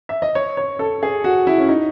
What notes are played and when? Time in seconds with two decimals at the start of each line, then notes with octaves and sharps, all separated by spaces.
0.09 E5
0.22 D#5
0.35 C#5
0.57 C#5
0.79 A4
1.03 G#4
1.24 F#4
1.47 E4
1.59 C#4
1.69 D#4